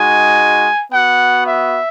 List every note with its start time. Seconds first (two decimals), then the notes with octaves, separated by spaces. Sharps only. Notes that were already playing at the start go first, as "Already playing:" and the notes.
Already playing: G#3 D#4 F#4 G#5
0.91 B3 F#4 F#5
1.45 E5